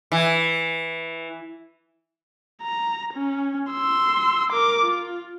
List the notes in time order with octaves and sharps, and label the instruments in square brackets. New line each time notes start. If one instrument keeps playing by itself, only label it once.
[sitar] E3
[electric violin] A#5
C#4
C6 E6
A#4 D6
F4